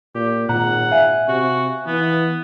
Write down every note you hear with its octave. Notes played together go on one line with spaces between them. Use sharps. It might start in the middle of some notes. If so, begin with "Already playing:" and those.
A#2 G4
G#1 A#2 F#5 A#5
E5 F5 G#5
C3 F#4
E3 B3